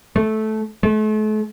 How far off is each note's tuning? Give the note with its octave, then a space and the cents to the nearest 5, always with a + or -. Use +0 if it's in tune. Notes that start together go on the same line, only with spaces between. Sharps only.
A3 -15
A3 -40